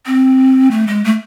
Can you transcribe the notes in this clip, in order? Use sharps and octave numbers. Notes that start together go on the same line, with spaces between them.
C4
A3
G#3
A3